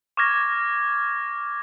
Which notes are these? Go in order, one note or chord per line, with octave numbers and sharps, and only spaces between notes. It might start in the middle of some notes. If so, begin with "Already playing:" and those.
C#6 D6 F6 G#6 A#6